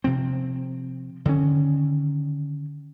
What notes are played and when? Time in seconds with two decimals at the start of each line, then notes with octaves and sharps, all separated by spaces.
0.04 C3 F3 C4
1.25 D3 D#3 A3 C#4